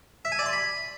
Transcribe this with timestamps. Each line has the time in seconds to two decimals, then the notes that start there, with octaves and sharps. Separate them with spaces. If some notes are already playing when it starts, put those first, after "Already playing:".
0.25 E5
0.32 G#5
0.39 D5
0.46 C6
0.53 B5